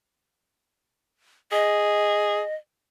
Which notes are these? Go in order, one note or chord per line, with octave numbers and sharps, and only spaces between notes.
G#4 D#5